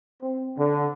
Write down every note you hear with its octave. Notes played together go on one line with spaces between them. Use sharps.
C4
D3